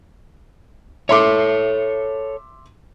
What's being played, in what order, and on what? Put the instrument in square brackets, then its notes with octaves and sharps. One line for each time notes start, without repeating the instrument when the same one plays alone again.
[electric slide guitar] A4 C#5 [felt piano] E5 C6 D6